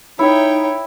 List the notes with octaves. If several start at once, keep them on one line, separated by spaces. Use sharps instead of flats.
D#4 E4 C#5 E5 G5